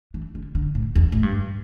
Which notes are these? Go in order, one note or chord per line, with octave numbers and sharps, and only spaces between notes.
E3
D3
D3
A2
E2
A2
G2